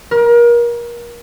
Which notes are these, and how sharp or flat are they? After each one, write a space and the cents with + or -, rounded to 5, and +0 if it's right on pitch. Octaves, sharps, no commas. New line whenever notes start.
A#4 +30